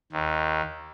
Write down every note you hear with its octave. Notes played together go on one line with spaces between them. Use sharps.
D#2